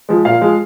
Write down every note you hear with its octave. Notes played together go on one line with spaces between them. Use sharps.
F3 G#3
A#2 F5
F3 G#3